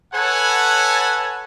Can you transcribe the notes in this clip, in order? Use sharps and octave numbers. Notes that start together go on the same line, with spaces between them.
A4 B4 C#5 F#5 G#5 A5